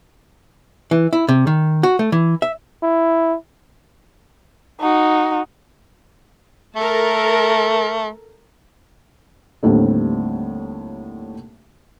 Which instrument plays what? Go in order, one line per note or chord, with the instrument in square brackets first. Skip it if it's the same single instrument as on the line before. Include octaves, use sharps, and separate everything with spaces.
[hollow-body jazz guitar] E3
E4
C3
D#3
F#4
A3
E3
E5
[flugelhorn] E4
[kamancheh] D#4 F#4
[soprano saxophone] A3 [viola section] A4 A#4
[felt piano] D#2 A2 D3 G3 C4